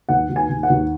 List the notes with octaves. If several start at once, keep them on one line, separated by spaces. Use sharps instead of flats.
D#2 F#5
D#2
G#5
D#2
F#5
D#2